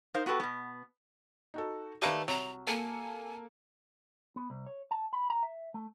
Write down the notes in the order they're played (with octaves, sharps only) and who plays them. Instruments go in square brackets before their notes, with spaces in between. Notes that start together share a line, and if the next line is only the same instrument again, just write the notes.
[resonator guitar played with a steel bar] D#4 A#4 C5 F5
B3 F#4 G4 A4 B4
B2 B3
[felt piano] D#4 F#4 A4
[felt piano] D#3 G4 [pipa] G3 A3 A#3 [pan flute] B4
[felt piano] C2 [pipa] F#3 [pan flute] A#5
[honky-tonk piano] A#3 A4 C#7 [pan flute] G#5
[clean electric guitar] B3
C2
C#5
A5
B5
A#5
E5
A3